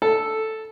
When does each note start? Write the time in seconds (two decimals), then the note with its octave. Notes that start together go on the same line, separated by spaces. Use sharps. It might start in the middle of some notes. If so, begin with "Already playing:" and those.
0.02 A4